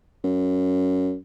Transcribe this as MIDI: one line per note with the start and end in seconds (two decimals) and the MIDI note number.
0.24 1.15 42